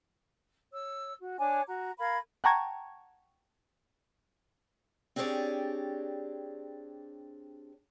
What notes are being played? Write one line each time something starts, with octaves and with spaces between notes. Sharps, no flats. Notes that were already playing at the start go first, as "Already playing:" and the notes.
C#5 E6
F#4
D4 C#5 G#5 D6
F#4 A#5
A#4 F5 B5 G#6
F#5 G5 A5 A#5 C#6 G#6
C4 D4 G4 G#4 C#5 D5